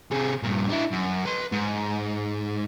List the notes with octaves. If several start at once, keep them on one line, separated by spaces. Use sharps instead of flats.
C3 G#4
G2 A#2
D4 E4
F#2
B4 C6
G#2